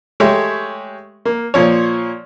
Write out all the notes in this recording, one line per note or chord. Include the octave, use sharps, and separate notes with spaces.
G#3 A3 G4 C#5 E5
A#3
A#2 F3 C#5